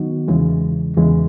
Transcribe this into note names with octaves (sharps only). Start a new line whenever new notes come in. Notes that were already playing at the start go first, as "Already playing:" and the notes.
Already playing: D#3 F#3 B3 D#4 F#4
E2 C#3 E3 G#3
E2 C#3 E3 G#3